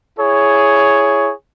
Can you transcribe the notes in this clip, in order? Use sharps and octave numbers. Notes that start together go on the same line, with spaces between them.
E4 G#4 C#5